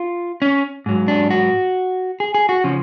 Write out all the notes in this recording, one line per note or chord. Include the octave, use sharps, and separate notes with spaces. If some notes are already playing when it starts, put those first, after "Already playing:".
Already playing: F4
C#4
G#2 F#3
D4
F#4
G#4
G#4
F#4
C#3 F3 C#4